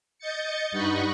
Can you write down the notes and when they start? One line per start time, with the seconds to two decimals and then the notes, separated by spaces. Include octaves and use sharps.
0.19 D#5 G6 A6 C#7
0.72 G2 D#4 D#5 F#5 B5 C#6